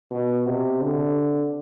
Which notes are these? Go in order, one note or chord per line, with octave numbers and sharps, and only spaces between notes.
B2
C3
D3